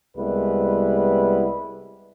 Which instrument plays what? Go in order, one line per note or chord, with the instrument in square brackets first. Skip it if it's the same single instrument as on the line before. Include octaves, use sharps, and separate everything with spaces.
[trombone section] C2 G3 G#3 B3 E4 B4